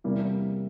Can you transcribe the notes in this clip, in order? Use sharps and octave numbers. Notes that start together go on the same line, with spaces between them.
E2 C3 G3 A#3 E4